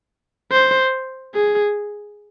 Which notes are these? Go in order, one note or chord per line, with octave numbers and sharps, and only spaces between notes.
C5
G#4